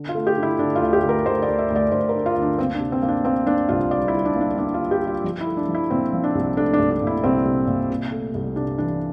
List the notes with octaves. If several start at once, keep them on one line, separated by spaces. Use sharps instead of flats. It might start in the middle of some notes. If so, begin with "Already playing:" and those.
Already playing: D3
F4
A3
G4
D3
E4
D3 D4
F4
D2
G4
D2
A#4
D2 C5
D5
D2
E5
D2
D5
D2 C5
A#4
D3
F4
D2
D4
A#3 C4
D4
C3
C4
A#3
D4
A#3 C4
A#3 D4
C2 F4
G3 D5
E4
G3
D4
A#3 D4
A#3 D4
F4
G3
G4
G3 F4
F3 F4
E4
A3
D4
F3
E4
A#2 C4
F3
D4
C2
A3 D4
D4
C2
D4
A#2 E4
C2 C4
C2
A#2
C3
A3
C2
C3 D4
E3 D4